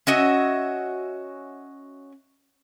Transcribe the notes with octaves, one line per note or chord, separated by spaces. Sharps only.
C#4 F#4 D#5 E5